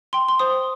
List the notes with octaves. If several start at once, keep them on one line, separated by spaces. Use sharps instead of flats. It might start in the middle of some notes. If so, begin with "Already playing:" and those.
G5 C6
C6
C5 D#6